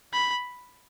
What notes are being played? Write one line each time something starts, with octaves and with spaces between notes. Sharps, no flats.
B5